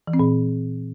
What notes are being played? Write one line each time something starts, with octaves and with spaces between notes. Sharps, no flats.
E3
C4
A#2